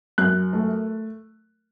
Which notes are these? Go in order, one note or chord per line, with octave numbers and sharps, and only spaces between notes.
F#2 F#6
A3